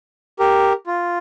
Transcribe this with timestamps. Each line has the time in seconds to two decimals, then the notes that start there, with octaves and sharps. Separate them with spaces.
0.40 G4 A#4
0.87 F4